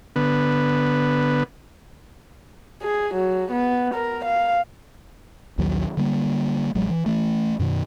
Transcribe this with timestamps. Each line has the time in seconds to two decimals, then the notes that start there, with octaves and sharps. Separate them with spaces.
0.16 D3 B3
2.83 G#4
3.14 F#3
3.52 B3
3.95 A#4
4.25 F5
5.58 A#1 D#2 D#3 F#3
5.97 D3 G3 A#3
6.75 A1 F#3 G#3
6.90 E3
7.06 E3 A3
7.59 F#2 B2 D#3